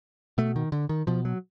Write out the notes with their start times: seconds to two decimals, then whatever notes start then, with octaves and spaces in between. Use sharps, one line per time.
0.38 B2 A3
0.56 D#3
0.72 D3
0.89 D#3
1.07 B2 F3
1.25 F#3